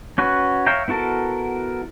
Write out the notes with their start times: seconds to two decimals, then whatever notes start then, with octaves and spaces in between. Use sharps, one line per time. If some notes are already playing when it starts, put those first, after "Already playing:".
0.18 C#4 F#4 B4
0.66 C#5 E5 F5 G5 A#5
0.88 B3 E4 F#4 A4 A#4